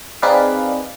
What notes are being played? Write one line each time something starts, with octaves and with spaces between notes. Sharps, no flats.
C4 D#4 G#4 B4 D5 F5